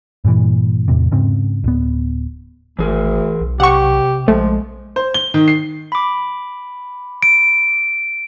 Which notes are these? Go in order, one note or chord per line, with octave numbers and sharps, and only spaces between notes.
G2 A#2 D#3 E3
E2 A2 C3
G#2 C#3 C4
D1 B3
G#1 D2 E3 G#4 A#4
B1
C3 G4 F#5 C#6
A#1 F3 G#3 A3
C5
G7
D#3
C7
B5 D6
D7